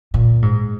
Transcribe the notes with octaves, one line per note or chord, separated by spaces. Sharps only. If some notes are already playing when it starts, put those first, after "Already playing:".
A#2
G#2